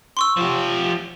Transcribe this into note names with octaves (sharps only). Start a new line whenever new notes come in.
C6 C#6 E6
F3 G4